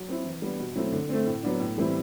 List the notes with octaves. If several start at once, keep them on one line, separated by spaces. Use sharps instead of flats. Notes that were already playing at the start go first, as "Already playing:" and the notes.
Already playing: F#3
C4 E4
E3
G3 B3 D4
B2
F#3 A3 C4 E4
D3
A3 C4
A2
F#3 B3 D4
A2
E3 G3 C4 E4